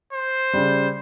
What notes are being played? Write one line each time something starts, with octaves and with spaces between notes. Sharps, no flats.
C5
C#3 G3